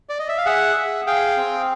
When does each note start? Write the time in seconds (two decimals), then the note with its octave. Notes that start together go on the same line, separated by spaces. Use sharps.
0.09 D5
0.19 D#5
0.29 E5
0.38 F5
0.46 G#4 E5 F#5
0.76 G#4
1.07 G#4 F5 G5
1.37 C4